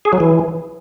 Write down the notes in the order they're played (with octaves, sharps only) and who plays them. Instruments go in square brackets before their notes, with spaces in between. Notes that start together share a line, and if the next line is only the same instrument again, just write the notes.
[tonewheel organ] G#4
F#3
E3